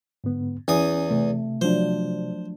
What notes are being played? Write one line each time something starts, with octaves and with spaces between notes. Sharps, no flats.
G#2 D3 B3
E2 C#4 G#5 D#6
C3 A3
F3 F#3 D4 C5